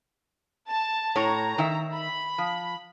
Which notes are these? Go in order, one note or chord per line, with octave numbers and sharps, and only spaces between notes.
A5
A2 C#5 A#5
D#3 E5
B5
F3